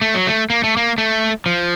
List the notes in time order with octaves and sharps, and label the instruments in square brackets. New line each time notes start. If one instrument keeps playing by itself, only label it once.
[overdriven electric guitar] A3
F#3
A3
A#3
A3
A#3
A3
F3